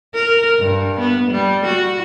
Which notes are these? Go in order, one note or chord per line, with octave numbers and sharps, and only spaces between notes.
A#4
G2
B3
G3
F#4